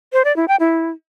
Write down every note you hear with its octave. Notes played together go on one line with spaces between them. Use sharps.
C5
D5
E4
G5
E4